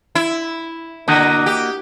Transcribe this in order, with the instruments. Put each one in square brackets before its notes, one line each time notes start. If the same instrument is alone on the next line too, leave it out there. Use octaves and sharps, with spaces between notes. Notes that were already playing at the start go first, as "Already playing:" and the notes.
[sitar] E4
[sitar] D3 [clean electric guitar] A#3 F#4 D#5
[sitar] G4